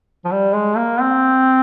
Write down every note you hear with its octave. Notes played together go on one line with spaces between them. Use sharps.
F3
G3
G#3
A#3
C4